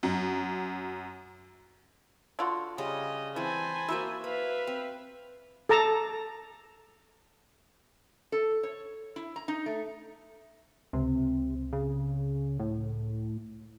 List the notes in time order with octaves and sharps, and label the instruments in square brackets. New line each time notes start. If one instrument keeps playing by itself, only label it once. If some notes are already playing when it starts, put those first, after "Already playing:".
[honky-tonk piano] F#2
[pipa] D3 F4 F#4
[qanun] C#3 G3 C#4 [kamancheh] D#5
[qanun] E3 C4 [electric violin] C5 G#5 [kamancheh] A5 B5
[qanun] A#3 F#4 E5 [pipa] E4
[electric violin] B4 [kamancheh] E5 F5 [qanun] B5
[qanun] C4
[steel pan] A4 A5 A#5
[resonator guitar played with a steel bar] A4
C#5
E4
A#5
D#4
A3
[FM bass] C#2 [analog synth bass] C3
[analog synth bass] C#3
A2